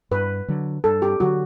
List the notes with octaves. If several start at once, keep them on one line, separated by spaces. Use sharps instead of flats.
G2 B4
D3 F#3
G2 A4
G4
D3 F#3 F#4